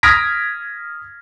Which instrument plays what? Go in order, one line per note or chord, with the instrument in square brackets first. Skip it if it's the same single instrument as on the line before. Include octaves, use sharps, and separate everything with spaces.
[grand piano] D#6 F6 G#6 A#6 B6 D7